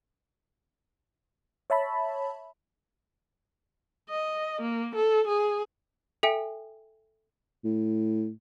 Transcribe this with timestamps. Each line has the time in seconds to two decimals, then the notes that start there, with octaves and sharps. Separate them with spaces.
1.70 C#5 E5 A5 B5
4.10 D#5
4.61 A#3
4.95 A4
5.28 G#4
6.23 A4 E5 G5 G#5
7.64 A2